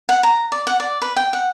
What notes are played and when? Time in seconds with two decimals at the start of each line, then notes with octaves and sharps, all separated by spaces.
0.09 F#5
0.23 A#5
0.52 D5
0.67 F#5
0.80 D5
1.02 B4
1.16 G5
1.33 F#5